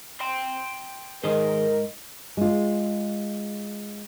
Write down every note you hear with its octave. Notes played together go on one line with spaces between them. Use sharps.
G5 C6
G#2 D#3 G#4 A#4 C5 D#5
G#3 F4